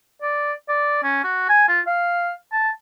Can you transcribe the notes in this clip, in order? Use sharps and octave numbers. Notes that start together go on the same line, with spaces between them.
D5
D5
C#4
F#4
G#5
F4
F5
A5